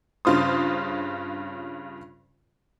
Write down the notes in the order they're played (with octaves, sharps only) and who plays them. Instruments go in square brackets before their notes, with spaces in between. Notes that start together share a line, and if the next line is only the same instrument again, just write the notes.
[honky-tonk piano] G2 C#3 F4 C5 D#6